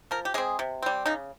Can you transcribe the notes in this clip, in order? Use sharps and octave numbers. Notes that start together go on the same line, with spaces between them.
F3 A#4
G4
G#3 C4 G#4
C3
G3 C4
C#3 D#4